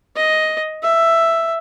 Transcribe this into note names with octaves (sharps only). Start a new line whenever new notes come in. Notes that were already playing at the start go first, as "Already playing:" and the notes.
D#5
E5